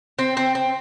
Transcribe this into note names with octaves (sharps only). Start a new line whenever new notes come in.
C4
C4
C4